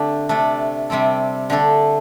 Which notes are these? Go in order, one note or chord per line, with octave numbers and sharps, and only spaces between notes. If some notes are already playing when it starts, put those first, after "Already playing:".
Already playing: D3 A3 C4 D4 G4
C3 A3 D4 A4
C3 G3 C4 A4
D3 A3 D4 A4